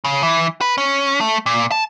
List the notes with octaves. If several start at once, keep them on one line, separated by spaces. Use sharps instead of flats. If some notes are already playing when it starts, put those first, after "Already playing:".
C#3
E3
B4
C#4
A3
A#2
A5